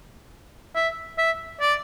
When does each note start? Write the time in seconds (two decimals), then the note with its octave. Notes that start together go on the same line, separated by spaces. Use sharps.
0.75 E5
1.18 E5
1.61 D5